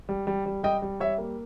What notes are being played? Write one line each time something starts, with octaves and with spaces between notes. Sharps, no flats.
G3
G3
G3
G3 D#5 G5
G3
G3 C#5 E5
A#3